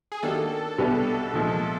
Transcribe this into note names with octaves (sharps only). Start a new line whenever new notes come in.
G#4
D#3 F#3 A#3 D4 G4 A4
C2 B2 G3 B3 D4
C2 A#2 F3 G#3